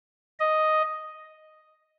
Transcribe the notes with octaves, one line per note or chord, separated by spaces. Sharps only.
D#5